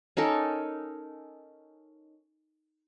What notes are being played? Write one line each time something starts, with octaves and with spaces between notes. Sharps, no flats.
C#4 D#4 A4 A#4